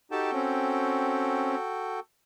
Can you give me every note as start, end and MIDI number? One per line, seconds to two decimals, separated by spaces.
0.11 0.31 63
0.11 2.00 66
0.11 0.31 67
0.11 2.00 69
0.11 2.00 79
0.11 0.31 81
0.33 1.56 60
0.33 1.56 61